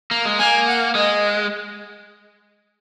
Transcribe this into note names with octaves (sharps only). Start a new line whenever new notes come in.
A#3
G#3
A#3 G#5
F#5
G#3 D#5